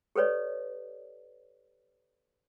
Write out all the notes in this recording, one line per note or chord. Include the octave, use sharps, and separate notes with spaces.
G4 A4 B4 C#5 D5